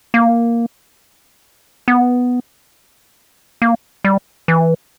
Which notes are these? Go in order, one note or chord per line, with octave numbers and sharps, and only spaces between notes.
A#3
B3
A#3
G3
E3